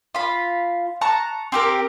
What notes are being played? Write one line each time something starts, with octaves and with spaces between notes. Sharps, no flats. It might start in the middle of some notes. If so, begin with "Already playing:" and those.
F4 B5
A5 A#5 C#6 F#6
C4 G4 A#4